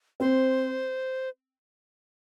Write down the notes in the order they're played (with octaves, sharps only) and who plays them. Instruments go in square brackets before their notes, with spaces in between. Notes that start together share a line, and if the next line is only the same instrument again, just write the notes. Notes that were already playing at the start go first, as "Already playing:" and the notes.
[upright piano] C4 [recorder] C5